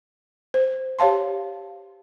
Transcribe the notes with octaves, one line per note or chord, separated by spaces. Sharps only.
C5
G4 C#5 F5 A5 C6